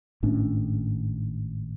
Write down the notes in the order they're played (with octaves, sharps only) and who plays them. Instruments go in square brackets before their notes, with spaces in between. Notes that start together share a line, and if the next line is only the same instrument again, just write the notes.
[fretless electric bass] G#1 A2 C#4 D4